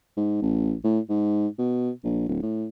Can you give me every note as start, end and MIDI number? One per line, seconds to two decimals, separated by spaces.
0.17 0.38 44
0.42 0.74 33
0.84 0.99 45
1.09 1.47 44
1.59 1.90 47
2.04 2.24 34
2.29 2.40 26
2.43 2.67 45